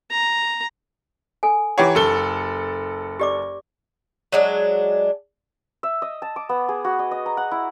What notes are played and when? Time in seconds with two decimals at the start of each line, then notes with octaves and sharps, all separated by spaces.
0.11 A#5
1.43 A4 G#5
1.78 E3 G4 C#5 F#5 G5 A#5
1.95 F#1 G4 A4 G7
3.20 G4 D5 D6
4.32 F#3 G#3 D4
5.83 E5
6.02 D#5
6.22 A5
6.36 D6
6.49 B3
6.69 G#4
6.85 F#4
6.99 D#5
7.11 D#5
7.26 A#5
7.37 F#5
7.51 E4